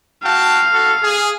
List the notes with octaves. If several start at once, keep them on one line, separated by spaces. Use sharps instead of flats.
F#4 F5 G5 A5
F#4 A4
G#4